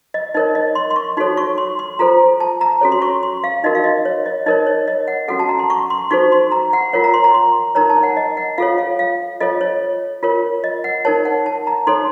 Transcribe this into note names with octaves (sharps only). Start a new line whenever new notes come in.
D#5
D#4 A#4 C#5 D#5
D#5
C6
C6
C#6
D#4 F#4 A4 C#5 C6
C#6
C6
C6
F4 A4 C5 A#5
A5
A#5
C#4 F#4 A4 C#5
C6
C#6
C6
F5
D#4 F#4 A#4 D#5
F5
D#5
C#5
D#5
D#4 A#4 C#5 D#5
C#5
D#5
F#5
C#4 F#4 A4 F#5
A5
A#5
C6
C#6
C6
D#4 F#4 A4 C5 C#6
C6
A#5
F#5
F4 A#4 C#5 F#5
A#5
C6
A#5
C6
D#4 A#4 C#5 A#5
A5
F#5
D#5
F#5
F4 A4 C#5 F5
F5
F5
F4 A4 C#5 D#5
C#5
F4 A#4 C#5
D#5
F#5
D#4 A#4 C#5 A5
F#5
A5
A#5
D#4 A4 C#5 C6